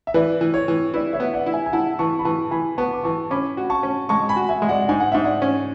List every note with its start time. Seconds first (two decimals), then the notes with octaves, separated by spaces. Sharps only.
0.07 E5
0.14 E3 B4 D5
0.41 E3
0.54 C#5
0.68 E3
0.94 E4 B4 D5
1.13 C#5 E5
1.20 B3
1.34 D5 F#5
1.46 E4
1.53 E5 G#5
1.66 G#5
1.73 E4 F#5 A5
1.99 E3 A5 C#6
2.19 B5
2.25 E3 A5 C#6
2.51 E3 G#5 B5
2.78 B3 A5 C#6
2.93 D6
3.04 E3 A5 C#6
3.30 C#4 B5 D6
3.57 F#4
3.70 A5 C#6
3.83 C#4
4.09 G#3 A5 C#6
4.29 G#5 B5
4.36 F#4
4.49 E5 G#5
4.62 G#3
4.68 D5 F#5
4.89 G#2 G#5
5.00 F#5
5.12 G#2 E5
5.24 D5 F#5
5.42 C#4